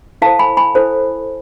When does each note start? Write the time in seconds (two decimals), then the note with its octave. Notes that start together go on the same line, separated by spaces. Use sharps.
0.22 E4 A4 C5 F5 A5
0.39 G#5 B5
0.57 G#5 B5
0.75 E4 A4 C5